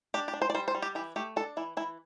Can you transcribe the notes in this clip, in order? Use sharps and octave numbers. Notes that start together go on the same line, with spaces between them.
D4 G4
G4
D4
C5
D5
G3 C5
C5
G3
G4
E3 G4
A3 G4
D4 A4
E3 E4
E3 E4